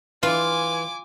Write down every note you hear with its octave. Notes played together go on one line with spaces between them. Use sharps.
E3 F4 G#5 D6